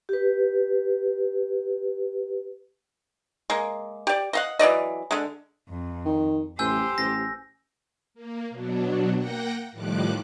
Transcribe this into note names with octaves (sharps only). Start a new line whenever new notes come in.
G4 B4
G#3 A#3
G4 D5
D#5 F5 F#5
E3 F#3 D5 D#5
D3 G#3
F2
D#3
A1 G4 C5 G#5 E6 G6
A1 A#6
A#3
B2 F#3 D4
A#3 F#5 G5 A#6
A2 D#3 F3 G3 D6 F#6